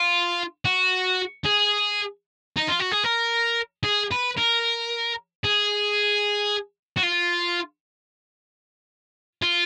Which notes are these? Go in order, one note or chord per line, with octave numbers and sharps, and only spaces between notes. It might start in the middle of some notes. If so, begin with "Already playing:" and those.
Already playing: F4
F#4
G#4
D#4
F4
F#4
G#4
A#4
G#4
B4
A#4
G#4
F#4
F4
F4